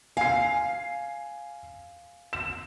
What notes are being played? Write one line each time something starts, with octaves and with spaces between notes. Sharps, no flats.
F5 G#5 C7
E7